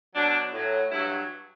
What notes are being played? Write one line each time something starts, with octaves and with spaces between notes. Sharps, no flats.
B2 F#3 D4
A2 F#3
G2 F#3 E4